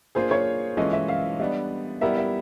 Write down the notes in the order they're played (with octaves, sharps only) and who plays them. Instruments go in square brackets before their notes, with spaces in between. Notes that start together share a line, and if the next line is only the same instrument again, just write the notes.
[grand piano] A#3 D4 F4 G#4 [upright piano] C5
[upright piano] C#5
[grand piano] E3 G#3 C#4 F4 A4 [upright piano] D#5
[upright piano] E5
F5
[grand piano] G3 B3 D4 [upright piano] D#5
[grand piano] G3 B3 E4 G4 A#4 [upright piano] E5
[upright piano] E5